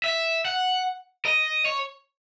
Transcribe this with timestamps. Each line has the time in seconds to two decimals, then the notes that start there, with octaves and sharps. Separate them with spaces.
0.04 E5
0.45 F#5
1.25 D#5
1.65 C#5